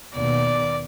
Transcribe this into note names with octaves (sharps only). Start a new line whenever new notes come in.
D#2 B2 B3 D5